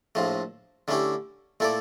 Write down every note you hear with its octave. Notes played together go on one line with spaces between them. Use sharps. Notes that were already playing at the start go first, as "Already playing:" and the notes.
A#1 A2 F3 A3
D3 A3 C#4 E4 G4
A#2 A3 E4 A4 D5